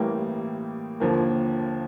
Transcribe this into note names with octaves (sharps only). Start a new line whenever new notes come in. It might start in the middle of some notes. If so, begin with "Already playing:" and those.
Already playing: A1 A2 E3 G3 A#3
D#2 D3 F3 A#3